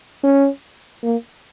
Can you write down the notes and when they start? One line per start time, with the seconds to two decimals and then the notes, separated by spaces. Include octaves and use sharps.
0.23 C#4
1.03 A#3